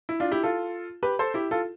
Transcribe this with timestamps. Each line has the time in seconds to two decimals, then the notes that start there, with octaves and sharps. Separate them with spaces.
0.09 E4
0.20 D4 F4
0.31 E4 G4
0.43 F4 A4
1.03 G4 B4
1.19 A4 C5
1.34 E4 G4
1.51 F4 A4